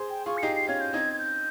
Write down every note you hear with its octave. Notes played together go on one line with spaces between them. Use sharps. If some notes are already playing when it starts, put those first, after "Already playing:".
Already playing: G#4 C5
G5
F4 G#4 C#6
C#7
D#4 G4 C7
C7
C#4 F4 G#6
G6
C4 D#4 G#6
G#6
G6